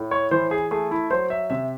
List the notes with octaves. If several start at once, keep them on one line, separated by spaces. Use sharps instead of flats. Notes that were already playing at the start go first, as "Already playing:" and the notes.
Already playing: A2
C#5
E3 C5
G#4
A3 G#4
E4
F#3 C5
E5
C3 E5